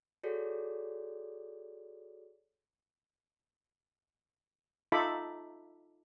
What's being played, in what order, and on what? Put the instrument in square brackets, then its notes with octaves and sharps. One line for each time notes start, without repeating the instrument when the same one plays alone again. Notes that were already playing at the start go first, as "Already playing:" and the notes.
[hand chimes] F#4 G#4 A4 C#5 D5
[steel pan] D#4 F4 A4 E5 B5 D6